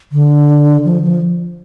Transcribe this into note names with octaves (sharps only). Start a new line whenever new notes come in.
D3
F3
F3